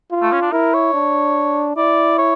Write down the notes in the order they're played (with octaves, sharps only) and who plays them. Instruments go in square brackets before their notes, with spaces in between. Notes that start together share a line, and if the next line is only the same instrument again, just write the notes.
[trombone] F4
[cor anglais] A3
C#4
D4
[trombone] E4 [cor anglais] A#4
[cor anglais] C#5
[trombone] D4
[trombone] E4 [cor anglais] D5
[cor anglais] C#5